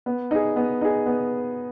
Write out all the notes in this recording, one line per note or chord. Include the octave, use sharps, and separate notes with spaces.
B3
D#4 G#4
B3
D#4 G#4
B3